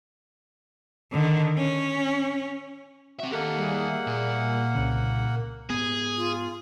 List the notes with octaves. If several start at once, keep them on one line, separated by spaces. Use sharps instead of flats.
D3 D#3
C#4
C4 F#4 E5
D#3 A#3 G4 A4 F#5
G3 G#4 E5
A#2
C2 C#3
G#2 B3 G#4
F4